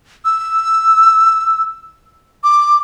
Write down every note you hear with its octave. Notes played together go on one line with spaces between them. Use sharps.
E6
D6